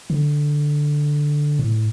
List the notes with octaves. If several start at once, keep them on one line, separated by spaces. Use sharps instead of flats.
D3
A2